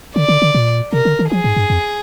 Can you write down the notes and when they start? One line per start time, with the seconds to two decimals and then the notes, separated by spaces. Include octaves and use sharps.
0.16 D3 D5
0.28 D3
0.42 D3
0.55 A#2
0.93 C3 A#4
1.05 D3
1.19 D#3
1.32 F3 G#4
1.44 G#2
1.56 G2
1.70 F2